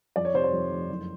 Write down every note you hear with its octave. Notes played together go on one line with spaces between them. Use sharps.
F2 D5
C#5
C3 C5
C5
F2
F1
F#1